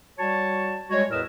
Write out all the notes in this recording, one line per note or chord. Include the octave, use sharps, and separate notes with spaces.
G3 F#4 C#5 A5
G3 G#3 F#4 C#5
E2 A2 A#4 B4 D#5 E6